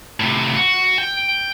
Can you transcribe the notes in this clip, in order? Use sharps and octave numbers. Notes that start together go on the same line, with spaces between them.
A2 C3
F#4
G5